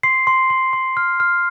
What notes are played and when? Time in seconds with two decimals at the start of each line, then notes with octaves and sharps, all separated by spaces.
0.03 C6 C7
0.27 C6
0.50 C6
0.73 C6
0.97 F6
1.20 F6